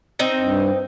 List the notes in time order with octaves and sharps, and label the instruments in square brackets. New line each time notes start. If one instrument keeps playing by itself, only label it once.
[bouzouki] C4 D#4 G5
[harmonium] G2